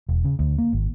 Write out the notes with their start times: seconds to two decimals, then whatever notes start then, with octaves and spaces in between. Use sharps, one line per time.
0.09 E1
0.24 C#3
0.39 D2
0.58 A#3
0.73 G#1